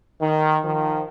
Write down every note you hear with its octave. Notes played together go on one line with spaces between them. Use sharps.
D#3
D#3 F3